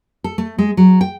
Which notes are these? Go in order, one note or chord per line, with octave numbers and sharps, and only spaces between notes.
A4
A3
G#3
F#3
G5